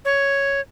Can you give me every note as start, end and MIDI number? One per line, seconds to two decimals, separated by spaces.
0.05 0.60 73